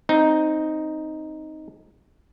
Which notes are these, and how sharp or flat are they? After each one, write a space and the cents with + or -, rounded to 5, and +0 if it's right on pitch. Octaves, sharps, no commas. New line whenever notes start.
C4 +5 D#4 +0